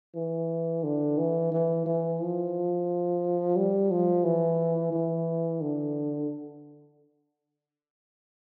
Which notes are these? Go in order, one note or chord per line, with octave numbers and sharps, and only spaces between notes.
E3
D3
E3
E3
E3
F3
G3
F3
E3
E3
D3